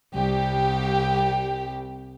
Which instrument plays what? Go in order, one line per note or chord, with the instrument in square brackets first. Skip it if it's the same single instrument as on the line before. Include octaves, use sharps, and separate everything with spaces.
[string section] C2 G4